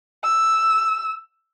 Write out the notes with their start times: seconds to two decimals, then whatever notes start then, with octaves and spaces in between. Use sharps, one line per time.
0.24 E6